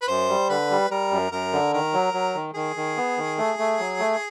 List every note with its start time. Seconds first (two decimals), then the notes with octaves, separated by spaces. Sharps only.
0.02 B4
0.08 F#2 C5
0.29 G3
0.49 D3 B4
0.70 G3
0.90 G3 A#4
1.11 F#2
1.32 F#2 A#4
1.53 D3
1.73 D#3 A#4
1.93 F#3
2.14 F#3
2.35 D#3
2.55 D#3 G#4
2.76 D#3
2.97 B3
3.18 D#3
3.38 A3
3.59 A3
3.79 F#3
4.00 A3